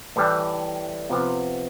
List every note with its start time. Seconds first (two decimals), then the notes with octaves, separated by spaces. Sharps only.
0.16 A2 E3 G3
1.09 C3 F3 B3